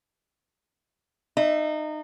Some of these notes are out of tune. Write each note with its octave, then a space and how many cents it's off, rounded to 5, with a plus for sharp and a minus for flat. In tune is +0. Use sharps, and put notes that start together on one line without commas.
D#4 -25 E5 +0